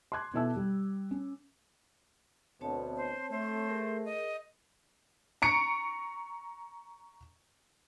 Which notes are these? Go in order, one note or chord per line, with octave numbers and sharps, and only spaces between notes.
C6 D6 F#6 G#6
B2 E4 A4 E5 A5 E6
G3
C#4
D2 B2 C4 C#5 A5
C5
A3 C5
G#4 A#4
D#5
A#5 C#6 C#7 D7